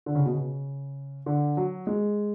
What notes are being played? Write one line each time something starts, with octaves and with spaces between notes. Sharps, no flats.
D3
C#3
B2
C#3
D3
F#3
G#3